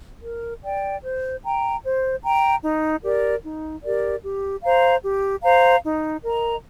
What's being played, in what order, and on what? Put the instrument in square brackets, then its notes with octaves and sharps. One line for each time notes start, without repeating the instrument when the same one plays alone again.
[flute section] A#4
D5 G5
C5
G5 A#5
C5
G5 A#5
D#4
G4 A#4 D5
D#4
G4 A#4 D5
G4
C5 F5 A#5
G4
C5 F5 A#5
D#4
A#4 D#5 A#5